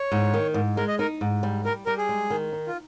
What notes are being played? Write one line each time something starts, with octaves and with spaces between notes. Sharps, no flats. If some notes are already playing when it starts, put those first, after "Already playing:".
Already playing: C#5
G#2
D#3
G#2
G#3 A#4
D#5
D#4 A#4
G#2
G3
G3 A#4
G3 A#4
G#4
G#3
D#3
D#4
F4